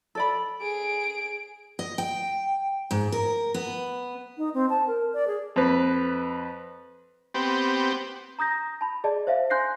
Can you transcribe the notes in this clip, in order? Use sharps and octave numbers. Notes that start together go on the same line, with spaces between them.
A4 D5 B5
G#4 D7
D#5
G5
G#2
A#4
B3
D#4
C4
A5
A#4
D5
G#4
F2 B4
B3 C4 G4
A#5 D#6 G6 A#6
A5 B5
G#4 D5 D#5 A5
C5 E5 F5
G#5 C6 F#6 G6 A#6 C7